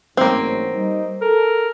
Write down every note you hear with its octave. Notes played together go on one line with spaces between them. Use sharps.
A1 G#2 F#3 A#3 C4
G3 D#4
A4 A#4